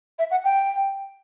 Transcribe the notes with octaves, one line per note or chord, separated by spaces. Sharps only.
E5
F#5
G5